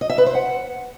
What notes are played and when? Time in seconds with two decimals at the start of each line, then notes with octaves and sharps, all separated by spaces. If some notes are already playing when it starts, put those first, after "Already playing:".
0.01 D#5
0.10 E5
0.18 B4
0.26 C5
0.35 F#5